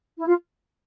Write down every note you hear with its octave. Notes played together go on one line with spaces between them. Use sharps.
E4
F4